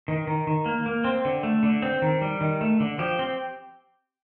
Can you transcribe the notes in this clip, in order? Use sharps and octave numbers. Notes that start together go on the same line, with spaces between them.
D#3
D#3
D#3
A#3
A#3
C4
D3
A3
D3
C4
D#3
G3
D#3
A3
D3
F3 G4
C4